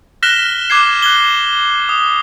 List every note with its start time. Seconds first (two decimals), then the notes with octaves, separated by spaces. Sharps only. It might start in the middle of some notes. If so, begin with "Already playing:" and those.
0.23 F6 F#6 A#6 B6 E7 G7
0.70 D6 F#6 G#6 C7
1.02 F#6 G#6 G7
1.89 D#6